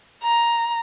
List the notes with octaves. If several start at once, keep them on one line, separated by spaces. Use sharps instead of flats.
A#5